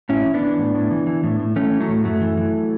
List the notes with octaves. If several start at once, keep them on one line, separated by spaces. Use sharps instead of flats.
A2 C#4 E4
E3
B3 D4
E3
A2
A2
E3
E3
A2
A2
E3 A3 C#4
E3
F#3 A3
A2
F#2 F#3 A3
E3
E3